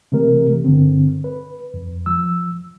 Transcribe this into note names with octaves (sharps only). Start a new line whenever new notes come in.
C3 E3 A3 C4 G4 A#4
G2 D3 C4
B4
F2
F3 E6